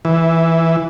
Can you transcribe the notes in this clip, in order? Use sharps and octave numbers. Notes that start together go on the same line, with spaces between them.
E3